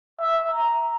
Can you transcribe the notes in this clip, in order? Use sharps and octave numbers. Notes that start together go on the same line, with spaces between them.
E5
A#5